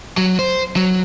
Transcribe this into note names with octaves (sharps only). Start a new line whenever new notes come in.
F#3
C5
F#3